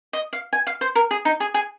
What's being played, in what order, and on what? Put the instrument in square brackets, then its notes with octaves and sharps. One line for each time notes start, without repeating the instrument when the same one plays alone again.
[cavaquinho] D#5
F5
G#5
F5
C5
A#4
G#4
D#4
G#4
G#4